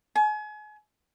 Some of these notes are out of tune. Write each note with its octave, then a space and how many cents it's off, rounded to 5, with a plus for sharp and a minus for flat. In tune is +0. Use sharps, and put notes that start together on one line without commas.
G#5 +35